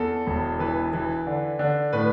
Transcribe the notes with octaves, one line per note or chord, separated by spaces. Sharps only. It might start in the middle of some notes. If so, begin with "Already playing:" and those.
Already playing: E2 A4
E1
E3 B4
E3
D3
D3
A2 B4